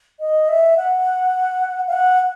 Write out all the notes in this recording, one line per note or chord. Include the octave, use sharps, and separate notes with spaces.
D#5
E5
F#5
F5
F#5